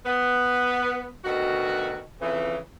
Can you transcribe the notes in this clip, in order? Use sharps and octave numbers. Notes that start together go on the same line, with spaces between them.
B3
D2 B2 D#3 F#4
F2 C#3 E3